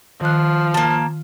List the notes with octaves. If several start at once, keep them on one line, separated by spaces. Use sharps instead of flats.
D#3 F3 F#6
A#3 A5